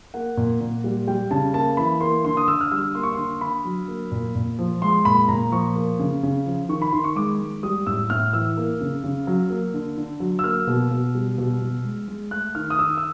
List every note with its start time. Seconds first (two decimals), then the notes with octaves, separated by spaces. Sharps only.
0.14 A#3 F#5
0.37 A#2
0.61 A#2
0.84 G3
1.07 G3 G5
1.31 C#3 A5
1.54 A#3 A5
1.77 E3 B5
2.01 A#3 C6
2.25 D3 C6
2.37 D#6
2.48 D3 E6
2.61 F6
2.71 G3 E6
2.95 A#3 C6
3.03 C#6
3.13 C6
3.18 D3
3.41 D3 B5
3.65 F#3
3.88 A#3
4.11 A#2
4.35 A#2
4.59 F3
4.82 G#3 C6
5.05 A#2 B5
5.28 A#2 A#5
5.52 F3 C#6
5.76 A#3
5.99 C#3
6.23 C#3
6.46 F3
6.69 D#3 C#6
6.82 B5
6.93 D#3 C6
7.04 C#6
7.16 G#3 D6
7.40 G#3
7.63 G3 D#6
7.86 A2 E6
8.10 A2 F6
8.33 E3 E6
8.57 A#3
8.81 C#3
9.03 C#3
9.27 F#3
9.50 A#3
9.74 D3
9.98 D3
10.20 F#3
10.39 E6
10.44 A#3 F6
10.67 B2
10.91 B2
11.15 G3
11.38 B2
11.62 B2
11.84 G#3
12.08 G#3
12.31 A3 F#6
12.55 D#3 F6
12.70 D#6
12.78 D#3 E6
12.97 E6